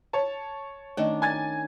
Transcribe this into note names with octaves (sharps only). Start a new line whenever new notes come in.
C#5 A5
D#3 A3 C#4 D4 D#5
G#5 G#6 A6